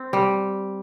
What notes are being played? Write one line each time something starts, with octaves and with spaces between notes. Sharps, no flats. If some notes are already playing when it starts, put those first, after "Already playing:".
Already playing: C4
G3